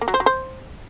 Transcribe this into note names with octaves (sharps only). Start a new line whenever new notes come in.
A#3
F#3
C5
F#3
C5